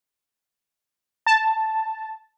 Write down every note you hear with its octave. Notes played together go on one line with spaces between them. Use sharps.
A5